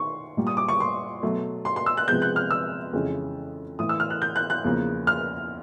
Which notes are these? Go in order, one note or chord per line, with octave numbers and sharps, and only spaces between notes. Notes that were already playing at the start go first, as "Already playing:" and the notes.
Already playing: D#3 C6 C#6
A#2 G3 A#3
D#6
D6
C#6
C6
B2 F#3 A3
C6
C6
E6
F#6
C3 F3 G#3 B3 G6
F#6
F6
E6
F2 C#3 E3 G#3 C#4
A2 E3 A3 D#6
E6
F6
F#6
G6
F#6
F#6
E2 C#3 F3 A#3
F6